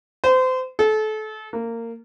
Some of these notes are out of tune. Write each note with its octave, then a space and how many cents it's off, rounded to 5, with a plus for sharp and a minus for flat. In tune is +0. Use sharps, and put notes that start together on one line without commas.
C5 -30
A4 -30
A#3 -20